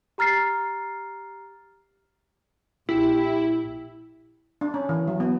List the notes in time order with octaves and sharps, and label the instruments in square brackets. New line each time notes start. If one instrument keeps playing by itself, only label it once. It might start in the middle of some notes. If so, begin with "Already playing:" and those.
[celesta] G4 A#5 F6 A6 C7
[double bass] A#1 [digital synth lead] E4 [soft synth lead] G4
[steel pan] D4
C#4
E3
F#3
B3